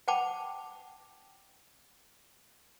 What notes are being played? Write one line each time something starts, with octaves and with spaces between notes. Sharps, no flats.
F#5 G5 A5 B5 D6